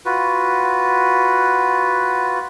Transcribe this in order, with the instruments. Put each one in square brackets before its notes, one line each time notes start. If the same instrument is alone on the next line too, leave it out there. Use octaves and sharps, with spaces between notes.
[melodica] F4 F#4 B4